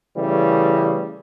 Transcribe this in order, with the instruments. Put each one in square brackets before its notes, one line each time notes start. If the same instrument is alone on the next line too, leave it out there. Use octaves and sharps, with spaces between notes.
[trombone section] C#3 E3 G3 A3